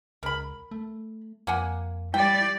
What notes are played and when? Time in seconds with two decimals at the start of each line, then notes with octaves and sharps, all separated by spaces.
0.23 C#2 A#4 B5
0.71 A3
1.47 F2 A#3 F#5 G#5
2.14 G3 E4 D5 G5